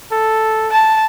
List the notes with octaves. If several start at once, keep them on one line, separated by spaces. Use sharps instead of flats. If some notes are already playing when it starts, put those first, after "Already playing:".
A4
A5